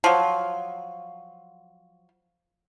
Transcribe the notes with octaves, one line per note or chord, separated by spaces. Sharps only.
F3 F#3